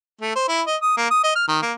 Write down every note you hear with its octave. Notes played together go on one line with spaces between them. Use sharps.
A3
C5
E4
D#5
D#6
A#3
D#6
D#5
F6
D#3
A#3